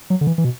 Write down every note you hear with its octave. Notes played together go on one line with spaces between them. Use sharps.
F#3
D3
E3
E3
B2